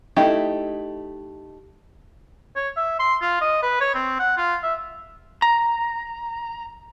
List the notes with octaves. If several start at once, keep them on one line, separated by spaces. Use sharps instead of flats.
A3 D#4 E4 G4
C#5
E5
C6
F4
D#5
B4
C#5
C4
F#5
F4
E5
A#5